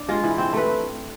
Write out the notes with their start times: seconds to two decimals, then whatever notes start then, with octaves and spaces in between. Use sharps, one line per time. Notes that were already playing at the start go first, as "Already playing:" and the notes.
Already playing: D4
0.09 G#3 F4
0.24 E3
0.38 C4
0.53 A3 B4